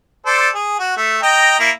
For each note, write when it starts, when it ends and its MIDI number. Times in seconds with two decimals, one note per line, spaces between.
0.26 0.49 69
0.26 0.49 72
0.26 0.49 74
0.55 0.78 68
0.79 0.92 66
0.97 1.18 57
1.23 1.58 75
1.23 1.58 79
1.23 1.58 82
1.60 1.70 58
1.60 1.70 64